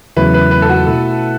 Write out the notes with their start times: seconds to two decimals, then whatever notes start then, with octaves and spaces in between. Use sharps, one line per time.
0.17 E2 C#3 F#3 A3 E4 B4
0.34 B4
0.51 B4
0.62 A4
0.69 F#4
0.87 B2 A3 E4 A4